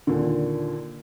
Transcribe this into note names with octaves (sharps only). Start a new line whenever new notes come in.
D#2 A#2 D3